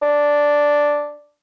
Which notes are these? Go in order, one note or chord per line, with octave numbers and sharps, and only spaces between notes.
D4